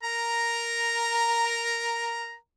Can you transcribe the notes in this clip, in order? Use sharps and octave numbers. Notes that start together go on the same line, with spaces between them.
A#4 A#5